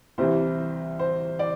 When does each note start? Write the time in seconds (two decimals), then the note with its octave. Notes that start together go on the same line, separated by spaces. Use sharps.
0.18 C2 C3 E3 C5
0.99 C5
1.39 D5